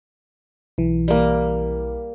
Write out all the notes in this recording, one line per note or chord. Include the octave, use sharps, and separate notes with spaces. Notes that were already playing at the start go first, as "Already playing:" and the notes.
B1 E3
G3 A#3